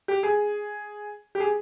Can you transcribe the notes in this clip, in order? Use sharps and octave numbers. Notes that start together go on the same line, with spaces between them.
G4
G#4
G4
G#4